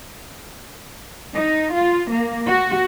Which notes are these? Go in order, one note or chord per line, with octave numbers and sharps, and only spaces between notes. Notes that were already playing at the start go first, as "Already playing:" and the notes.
D#4
F4
A#3
F#4